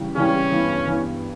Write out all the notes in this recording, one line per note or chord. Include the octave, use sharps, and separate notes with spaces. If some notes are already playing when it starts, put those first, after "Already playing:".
Already playing: C#3 E3 G3
C#3 E3 G3 C#4
G2 E3 B3
G2 E3 B3